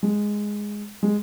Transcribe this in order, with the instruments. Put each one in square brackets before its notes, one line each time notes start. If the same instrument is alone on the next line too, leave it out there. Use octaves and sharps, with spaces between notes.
[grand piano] G#3
G#3